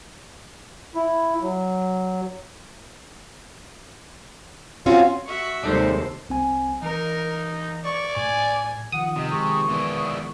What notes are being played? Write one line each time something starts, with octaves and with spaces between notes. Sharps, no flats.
E4
F#3
C4 C#4 F4 F#4
F#4 E5 C#6
D#2 C3 G#3 D#4 A4 C5 D5
C2 C4 G#5
E3 D#4 A#4
D5 C#6
A2 G#5
D#3 F3 F#5 D#6
C3 D#5
D#3 G#3 G#4 C#6
E3 B3 D4